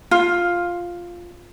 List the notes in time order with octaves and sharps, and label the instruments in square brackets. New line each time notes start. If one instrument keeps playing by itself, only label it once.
[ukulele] F4